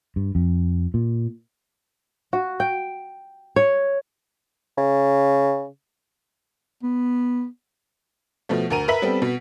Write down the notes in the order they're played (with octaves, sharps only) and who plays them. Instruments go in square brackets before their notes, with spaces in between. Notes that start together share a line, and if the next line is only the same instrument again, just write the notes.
[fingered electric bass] G2
F2
A#2
[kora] F#4
G5
C#5
[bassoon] C#3
[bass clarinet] B3
[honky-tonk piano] B2 F3 A3
D2 A#4 A#5 D#7
A#4 B4 E5 B6 F#7
G3 B3 C4 A4
B2